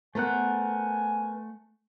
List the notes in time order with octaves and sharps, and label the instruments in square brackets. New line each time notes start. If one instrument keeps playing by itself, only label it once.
[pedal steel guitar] A3 F#5 [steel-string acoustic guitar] B3 A#4 C5 [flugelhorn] G#5